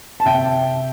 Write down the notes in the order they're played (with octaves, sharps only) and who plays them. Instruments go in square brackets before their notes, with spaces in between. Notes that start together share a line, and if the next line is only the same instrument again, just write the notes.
[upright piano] A5
C3 E5 G5